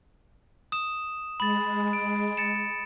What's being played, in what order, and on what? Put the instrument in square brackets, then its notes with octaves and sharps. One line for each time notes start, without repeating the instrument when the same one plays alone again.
[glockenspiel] D#6 E7
[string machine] G#3 [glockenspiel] B5 A6
[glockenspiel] D7
A6 C#7 E7